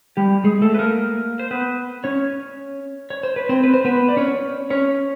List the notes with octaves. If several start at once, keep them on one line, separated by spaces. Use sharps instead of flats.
G3 G4
G#3 G#4
A3 A4
B4
A#3 A#4
C5
B3 B4
C#4 C#5
C#5
C5
B4
C4 C5
B4
C5
B3 B4
D5
C#4 C#5
C#4 C#5